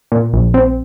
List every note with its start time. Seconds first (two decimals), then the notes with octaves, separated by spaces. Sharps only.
0.12 A#2
0.33 A#1
0.54 C4